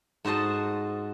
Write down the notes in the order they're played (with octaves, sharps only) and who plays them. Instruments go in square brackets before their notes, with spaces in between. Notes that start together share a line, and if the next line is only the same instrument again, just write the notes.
[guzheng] G#2 F#4 C5 D#5 A5